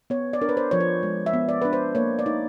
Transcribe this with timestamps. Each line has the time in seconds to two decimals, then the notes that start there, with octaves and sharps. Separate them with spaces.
0.10 B3 C#5
0.33 D5
0.41 D4 A#4
0.49 B4
0.57 C5
0.71 F3 C#5
0.80 C5
1.03 G#3
1.26 E5
1.33 B3
1.49 D5
1.62 D4 B4
1.73 C5
1.95 A#3 C#5
2.19 D5
2.26 D#4